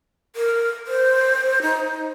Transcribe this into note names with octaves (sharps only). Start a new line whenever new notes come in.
A#4
C5
D#4